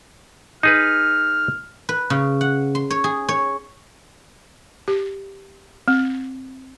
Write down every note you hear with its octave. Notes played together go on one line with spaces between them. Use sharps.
D#4 G#4 B4 F6
B4
C#3
F#5
C6
C#5
G#4
C#5
G4
C4